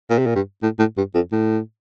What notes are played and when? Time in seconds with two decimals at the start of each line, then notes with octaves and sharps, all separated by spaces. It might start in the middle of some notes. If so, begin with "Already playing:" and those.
0.10 A#2
0.18 C3
0.26 A#2
0.35 G2
0.63 A2
0.79 A2
0.97 G2
1.15 F2
1.32 A2